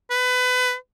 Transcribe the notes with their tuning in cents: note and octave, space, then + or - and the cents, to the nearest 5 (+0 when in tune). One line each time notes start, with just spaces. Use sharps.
B4 +25